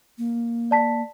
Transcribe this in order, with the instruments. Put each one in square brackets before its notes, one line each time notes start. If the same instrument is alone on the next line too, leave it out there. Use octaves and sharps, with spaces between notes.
[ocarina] A#3
[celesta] D5 A5 B6